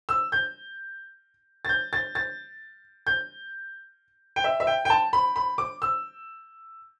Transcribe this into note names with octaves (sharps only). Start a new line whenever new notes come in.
E6
G6
A6
G6
A6
A6
G6
G5
E5
E5
G5
G5
A5
B5
B5
D6
E6